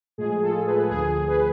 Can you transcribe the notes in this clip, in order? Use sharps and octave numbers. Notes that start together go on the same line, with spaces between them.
A2 F3 G#3 G#4
F4 A4
G#4 B4
D2 D3 F3 G#4
G#4 B4